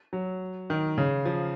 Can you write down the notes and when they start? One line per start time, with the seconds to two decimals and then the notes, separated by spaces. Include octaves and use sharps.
0.13 F#3
0.70 D#3
0.98 C#3
1.25 F3